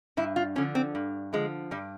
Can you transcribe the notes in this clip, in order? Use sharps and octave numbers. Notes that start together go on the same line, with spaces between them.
G2 E4
F4
D3 F3 C#4
C4
G2
D3 F3 G#3
G2 G3